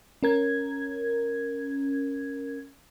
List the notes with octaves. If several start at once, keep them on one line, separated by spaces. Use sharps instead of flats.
C#4 A#4 G#6